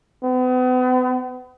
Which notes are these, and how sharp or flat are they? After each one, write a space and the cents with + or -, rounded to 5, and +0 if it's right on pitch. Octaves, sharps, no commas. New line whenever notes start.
B3 +40